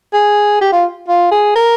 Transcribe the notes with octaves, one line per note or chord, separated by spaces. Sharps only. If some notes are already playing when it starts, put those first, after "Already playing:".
G#4
G4
F4
F4
G#4
A#4